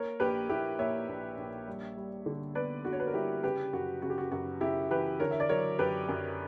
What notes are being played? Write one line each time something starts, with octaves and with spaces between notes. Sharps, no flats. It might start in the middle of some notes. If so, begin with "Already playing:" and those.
Already playing: A#3 A#4 C#5
A#1 G4 B4
A#1 E4 G4
A#2 C#5 E5
A#1
A#1
G3
G3
D3
B3 B4 D5
D3 F#4
C#5
B4
A#4
G3 E4 G4
C#3 G4 B4
F#2 F#4
C#3 F#4
G4
F#4
F#2 F#4
C#3 E4 G4
E3 G4 B4
D3 A#4 C#5
E5
D5
F#3 A#4 C#5
F#2 G4 B4
F#2